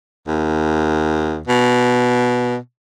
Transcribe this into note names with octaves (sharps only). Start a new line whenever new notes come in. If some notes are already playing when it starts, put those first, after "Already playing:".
D#2
B2